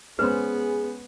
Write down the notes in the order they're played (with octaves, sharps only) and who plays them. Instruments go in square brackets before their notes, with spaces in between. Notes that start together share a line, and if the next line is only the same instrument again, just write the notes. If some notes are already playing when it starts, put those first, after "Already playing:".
[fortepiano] G#3 C#4 C5 [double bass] B3 [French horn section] G#4 [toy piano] B4